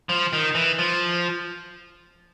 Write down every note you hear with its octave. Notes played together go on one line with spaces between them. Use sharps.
F3
D#3
E3
F3